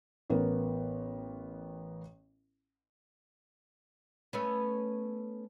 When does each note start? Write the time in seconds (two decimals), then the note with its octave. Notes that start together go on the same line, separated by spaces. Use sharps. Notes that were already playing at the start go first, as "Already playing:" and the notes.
0.30 A1 B3 A#4
4.33 A3 B3 C#4